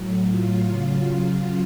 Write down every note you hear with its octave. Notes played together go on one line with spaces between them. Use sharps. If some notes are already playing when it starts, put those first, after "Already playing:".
Already playing: A2 F#3
F4
C#3 F#3